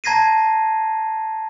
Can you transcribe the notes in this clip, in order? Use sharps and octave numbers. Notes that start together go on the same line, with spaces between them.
A5 A#5 G#6 A#6 C7 D#7